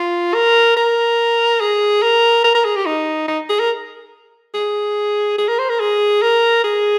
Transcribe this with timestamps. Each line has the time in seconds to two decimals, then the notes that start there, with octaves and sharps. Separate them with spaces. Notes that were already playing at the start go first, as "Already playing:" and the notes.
Already playing: F4
0.34 A#4
0.77 A#4
1.60 G#4
2.02 A#4
2.44 A#4
2.55 A#4
2.65 G#4
2.76 G4
2.86 D#4
3.28 D#4
3.49 G#4
3.59 A#4
4.54 G#4
5.38 G#4
5.48 A#4
5.59 C5
5.70 A#4
5.80 G#4
6.22 A#4
6.64 G#4